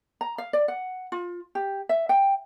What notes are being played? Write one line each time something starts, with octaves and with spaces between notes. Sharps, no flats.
A#5
F5
D5
F#5
F4
G4
E5
G5